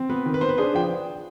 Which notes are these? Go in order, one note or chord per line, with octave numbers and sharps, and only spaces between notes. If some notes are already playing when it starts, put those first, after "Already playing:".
Already playing: C4
B3 B4
D#3
B4
B3 C5
B4
D4 G#4 C5
F3 G5